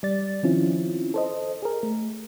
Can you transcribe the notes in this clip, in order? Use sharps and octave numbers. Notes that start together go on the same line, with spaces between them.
G3 D5 A6
D#3 F3 C4 C#4 E4 F4
A4 C5 D#5
G#4 A#4
A3